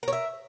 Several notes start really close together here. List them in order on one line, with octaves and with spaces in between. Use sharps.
A#4 C#5 E5